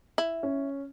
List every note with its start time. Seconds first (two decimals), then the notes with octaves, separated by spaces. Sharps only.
0.18 E4
0.43 C#4